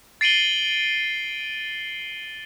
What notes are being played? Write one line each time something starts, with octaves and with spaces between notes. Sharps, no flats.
A6 C7 D7 D#7 F#7 G7